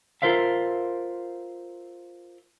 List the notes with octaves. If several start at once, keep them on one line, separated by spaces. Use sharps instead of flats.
F4 A#4 C5 E5 F5